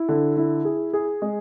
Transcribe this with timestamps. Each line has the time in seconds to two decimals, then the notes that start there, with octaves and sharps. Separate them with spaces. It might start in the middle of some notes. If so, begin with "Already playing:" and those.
Already playing: E4
0.08 D3
0.37 E4
0.65 G#4
0.93 G#4
1.22 G#3